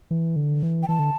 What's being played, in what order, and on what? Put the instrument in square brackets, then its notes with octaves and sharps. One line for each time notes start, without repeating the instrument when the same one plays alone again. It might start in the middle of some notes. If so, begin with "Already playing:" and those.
[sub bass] E3
D3
E3
[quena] G5
[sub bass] E3 [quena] A5
[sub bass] D3